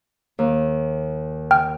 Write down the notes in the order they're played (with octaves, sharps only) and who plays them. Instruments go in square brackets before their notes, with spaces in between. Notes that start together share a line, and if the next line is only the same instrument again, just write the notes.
[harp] D#2
[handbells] G5 F6